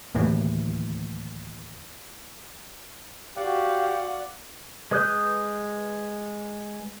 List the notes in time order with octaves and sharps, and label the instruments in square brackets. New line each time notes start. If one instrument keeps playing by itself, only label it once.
[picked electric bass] D1 D#2 A2 E3
[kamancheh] F#4 F5 [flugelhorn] G4 [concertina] D5 F#5
[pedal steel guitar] G#3 B4 D#6 F#6 G6